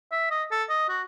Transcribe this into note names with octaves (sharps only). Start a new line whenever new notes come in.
E5
D#5
A4
D#5
F#4